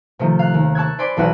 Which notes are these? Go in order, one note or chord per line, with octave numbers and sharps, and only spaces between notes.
C3 D#3 F3 A3
F5 F#6
D#2
A5 C#6 E6 F#6 G#6
C5 D5 G#5 B5 C6 D6
B1 E2 E4 F#4 F#5 G6